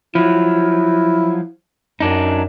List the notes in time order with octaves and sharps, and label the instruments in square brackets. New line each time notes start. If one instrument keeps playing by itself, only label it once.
[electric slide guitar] F3 F#3 [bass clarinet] E4
[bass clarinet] F#2 [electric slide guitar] F#3 D4 D#4